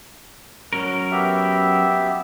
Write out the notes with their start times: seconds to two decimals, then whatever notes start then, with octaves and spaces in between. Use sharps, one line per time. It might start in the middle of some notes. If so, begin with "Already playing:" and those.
0.73 F#3 C#4 A#4
1.11 B3 G4 E5